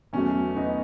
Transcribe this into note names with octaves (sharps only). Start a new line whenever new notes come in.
E2 B2 F#3 A3 C#4
B3 D#4